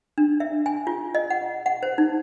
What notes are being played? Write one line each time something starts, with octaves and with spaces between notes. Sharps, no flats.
D4
E5
G#5
F4
D#5
F#5
F#5
C5
D#4